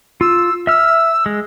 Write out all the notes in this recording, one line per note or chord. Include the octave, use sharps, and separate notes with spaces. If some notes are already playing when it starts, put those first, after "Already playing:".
F4 E6
E5 E6 F6
G#3